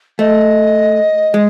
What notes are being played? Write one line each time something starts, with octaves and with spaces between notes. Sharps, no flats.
A3 D#5
G#3